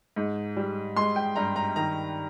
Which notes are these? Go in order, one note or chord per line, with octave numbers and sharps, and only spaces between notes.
G#2
G3
G#3 C6
G5
G2 A#5
A#5
D#3 A#5